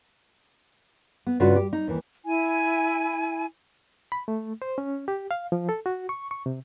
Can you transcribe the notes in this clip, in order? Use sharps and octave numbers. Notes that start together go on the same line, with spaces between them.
B3
G2 C#3 F4 F#4 B4 F#5
G4
D#4
D#2 E3
E4 G#5
B5
A3
C5
C#4
G4
F5
F3
A4
F#4
C#6
C#6
C3